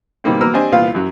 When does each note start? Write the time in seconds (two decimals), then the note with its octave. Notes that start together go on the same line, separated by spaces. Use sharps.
0.24 B2 D#3 G3 A#3 C4
0.41 F#3 A#3 B3 A#5 E6 F6
0.54 C4 D4 G4 C5 D#5 G#5
0.72 C2 A#2 B3 F4 F5
0.95 F#2 F#3